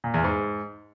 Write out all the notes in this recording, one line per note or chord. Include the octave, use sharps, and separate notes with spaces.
A#2
E2
G#2